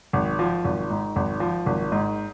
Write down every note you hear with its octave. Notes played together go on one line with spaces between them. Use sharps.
G#1
F3
G#1
G#2
G#1
F3
G#1
G#2